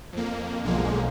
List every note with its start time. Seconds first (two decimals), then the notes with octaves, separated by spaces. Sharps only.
0.13 F2 A#3
0.63 B1 D3 F3 G#3 A#3